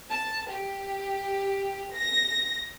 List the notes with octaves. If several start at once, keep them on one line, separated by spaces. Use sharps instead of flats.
A5
G4
A#6